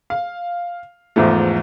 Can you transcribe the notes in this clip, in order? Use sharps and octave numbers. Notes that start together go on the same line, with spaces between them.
F5
E2 G#2 F3 A3